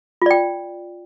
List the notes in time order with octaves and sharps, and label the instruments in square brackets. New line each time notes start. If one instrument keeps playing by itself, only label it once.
[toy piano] F4
D5
G5